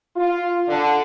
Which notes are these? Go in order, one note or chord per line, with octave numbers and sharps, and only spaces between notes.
F4
D3